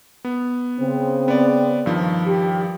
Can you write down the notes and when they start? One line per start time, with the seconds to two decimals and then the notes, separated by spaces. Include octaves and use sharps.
0.25 B3
0.80 C#3 C4
1.28 B3 D5
1.86 G2 D#3 F3
2.26 G4